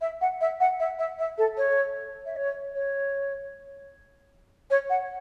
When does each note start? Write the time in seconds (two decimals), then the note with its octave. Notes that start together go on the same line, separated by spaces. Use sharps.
0.01 E5
0.21 F#5
0.41 E5
0.60 F#5
0.79 E5
0.99 E5
1.19 E5
1.38 A4
1.57 C#5
2.26 E5
2.36 C#5
2.74 C#5
4.70 C#5
4.90 F#5